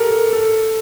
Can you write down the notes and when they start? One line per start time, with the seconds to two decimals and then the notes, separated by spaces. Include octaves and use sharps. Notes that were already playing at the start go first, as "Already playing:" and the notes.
Already playing: G4 A4 A#4
0.33 A4